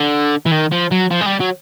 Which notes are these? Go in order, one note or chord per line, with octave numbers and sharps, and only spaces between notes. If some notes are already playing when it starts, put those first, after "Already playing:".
Already playing: D3
E3
D#3
F3
F#3
F3
G#3
G3
F#3